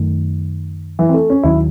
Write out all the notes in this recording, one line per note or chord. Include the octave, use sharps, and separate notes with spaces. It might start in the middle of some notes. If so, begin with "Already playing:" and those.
Already playing: F#2 D#3 A3
E3
C4
A3
C#4
D#2 D#3 F#3 E4